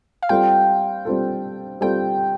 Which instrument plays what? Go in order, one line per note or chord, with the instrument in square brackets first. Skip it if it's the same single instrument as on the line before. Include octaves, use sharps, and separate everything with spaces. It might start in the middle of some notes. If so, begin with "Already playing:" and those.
[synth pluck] F5
[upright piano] G3 C4 F4 A4 [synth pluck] G5
[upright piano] G3 C4 F4 A4
[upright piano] G3 C4 F4 A4 [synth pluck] G5